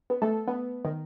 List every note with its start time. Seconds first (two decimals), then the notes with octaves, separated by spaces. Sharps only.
0.10 B3
0.22 A3 A4
0.48 B3
0.85 D#3